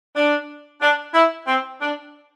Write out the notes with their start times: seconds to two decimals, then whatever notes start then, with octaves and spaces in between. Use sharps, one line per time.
0.15 D4
0.81 D4
1.14 E4
1.47 C4
1.81 D4